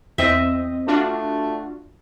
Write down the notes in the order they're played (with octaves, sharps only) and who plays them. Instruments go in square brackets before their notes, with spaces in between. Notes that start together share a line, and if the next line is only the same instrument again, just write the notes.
[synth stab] E2 C4 D#5 [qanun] E5
[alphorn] A3 [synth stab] D4 F4 F#4